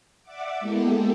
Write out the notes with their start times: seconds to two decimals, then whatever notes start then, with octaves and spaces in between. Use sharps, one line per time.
0.23 D5 E5 F#5 D6
0.60 G#3 A#3 B3 E4 G4 A4